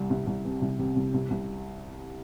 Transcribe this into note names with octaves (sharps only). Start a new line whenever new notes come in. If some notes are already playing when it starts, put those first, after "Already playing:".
Already playing: C2 G3
C2
C2
C3
C2
C3
C2
C2
C2